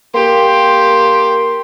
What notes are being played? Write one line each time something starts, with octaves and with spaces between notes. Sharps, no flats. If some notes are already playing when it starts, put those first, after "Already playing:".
A#3 G4 C6